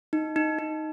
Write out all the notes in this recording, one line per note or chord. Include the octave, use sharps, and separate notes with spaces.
D#4
D#4
D#4